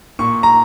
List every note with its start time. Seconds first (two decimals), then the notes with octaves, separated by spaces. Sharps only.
0.19 A#2 C#6
0.43 A#5